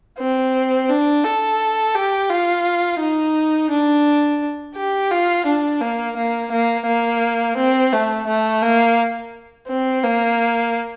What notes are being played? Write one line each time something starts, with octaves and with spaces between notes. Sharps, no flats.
C4
D4
A4
G4
F4
D#4
D4
G4
F4
D4
A#3
A#3
A#3
A#3
C4
A3
A3
A#3
C4
A#3